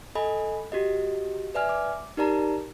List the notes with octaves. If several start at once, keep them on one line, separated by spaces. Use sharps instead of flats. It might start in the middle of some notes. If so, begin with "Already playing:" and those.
A4 D#5 G#5 B5
F#4 G4 D#5
B4 D5 E5 G#5 F6
D6
D#4 G4 A#4 D5 A5 A#5